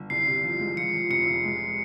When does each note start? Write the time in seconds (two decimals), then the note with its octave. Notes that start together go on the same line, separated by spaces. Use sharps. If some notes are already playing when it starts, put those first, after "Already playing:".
Already playing: G1
0.10 C2 C7
0.27 C3
0.43 F3
0.60 G#3
0.77 F3 C#7
0.93 F3
1.10 F1 C#7
1.26 F1
1.44 G#3